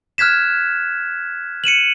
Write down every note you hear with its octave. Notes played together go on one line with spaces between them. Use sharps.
F6 F#6 G#6 B6 E7
C#7 D#7 E7 F#7